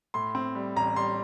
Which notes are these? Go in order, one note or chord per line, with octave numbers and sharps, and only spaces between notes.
A2 C6
C4
G3
A1 A#5
G3 C6